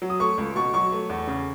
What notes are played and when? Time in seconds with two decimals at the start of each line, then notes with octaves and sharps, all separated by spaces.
0.02 F#3
0.10 D#6
0.20 A3 C#6
0.38 C#2
0.56 B2 C#6
0.74 F#3 C#6
0.92 A3
1.10 E2
1.27 C#3